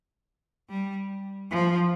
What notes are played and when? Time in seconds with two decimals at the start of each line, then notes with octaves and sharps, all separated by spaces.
0.69 G3
1.51 F3